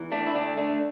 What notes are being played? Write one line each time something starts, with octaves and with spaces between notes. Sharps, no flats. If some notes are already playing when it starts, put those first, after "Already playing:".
Already playing: E2 E3
A3 D4
E4
D2 D3 A3 D4
A3 D4